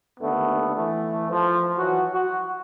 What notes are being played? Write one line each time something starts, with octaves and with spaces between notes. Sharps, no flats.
D#2 D3 A3 B3
E3 A3
F3
E3 F#3 F#4
F#4